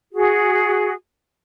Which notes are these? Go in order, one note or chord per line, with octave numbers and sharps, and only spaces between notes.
F#4 G#4